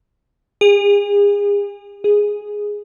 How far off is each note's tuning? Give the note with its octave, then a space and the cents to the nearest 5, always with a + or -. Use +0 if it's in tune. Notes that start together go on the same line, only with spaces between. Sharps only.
G#4 -35
G#4 -5